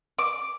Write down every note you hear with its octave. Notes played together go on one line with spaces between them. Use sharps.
D6